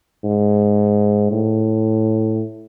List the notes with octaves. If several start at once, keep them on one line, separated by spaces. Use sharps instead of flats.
G#2
A2